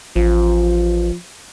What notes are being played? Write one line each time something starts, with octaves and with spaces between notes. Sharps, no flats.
A1 F3